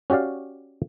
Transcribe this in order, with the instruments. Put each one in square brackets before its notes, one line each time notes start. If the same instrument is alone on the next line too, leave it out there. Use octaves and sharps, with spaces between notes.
[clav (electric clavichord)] C#4 F#4 G4 D5 F5